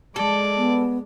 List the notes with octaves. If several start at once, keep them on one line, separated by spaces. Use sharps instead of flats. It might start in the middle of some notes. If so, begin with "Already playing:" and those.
G#3 A4 D5
B3